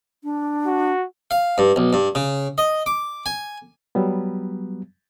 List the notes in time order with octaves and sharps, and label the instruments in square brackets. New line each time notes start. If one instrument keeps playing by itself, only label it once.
[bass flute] D4
[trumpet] F#4
[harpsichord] F5
G2
B1
G2
C#3
D#5
D6
G#5
[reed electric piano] F#3 G3 B3